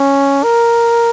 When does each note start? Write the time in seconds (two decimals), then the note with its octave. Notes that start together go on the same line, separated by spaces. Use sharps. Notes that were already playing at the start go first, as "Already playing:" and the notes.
Already playing: C#4
0.44 A#4